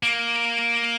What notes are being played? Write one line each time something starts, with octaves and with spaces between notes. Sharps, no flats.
A#3